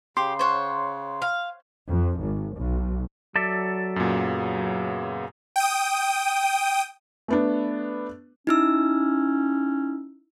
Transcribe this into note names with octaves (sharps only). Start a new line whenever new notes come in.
C#3 G4 C6
C5 C#5 F#5
F5
F2
G#1
B1
F#3 A4 D5 E5
F#2 A#2 C#3 B3
G5 D#6
A3 B3 D4
C#4 D#4 E4 E6